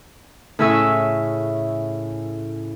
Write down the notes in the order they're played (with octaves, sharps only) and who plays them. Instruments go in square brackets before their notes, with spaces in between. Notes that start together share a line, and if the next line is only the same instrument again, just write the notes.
[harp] A2 C#3 E5 G#5 E6